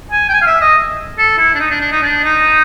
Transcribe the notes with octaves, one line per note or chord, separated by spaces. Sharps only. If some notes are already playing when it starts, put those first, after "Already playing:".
G#5
G5
G#5
F5
E5
D#5
A4
E4
D4
D#4
D4
D4
D#4
D4
D#4